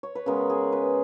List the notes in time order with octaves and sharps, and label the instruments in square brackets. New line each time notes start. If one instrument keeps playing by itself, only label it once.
[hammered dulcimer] C#5
B4
C#3 G#3 B3 A#4
G#4
B4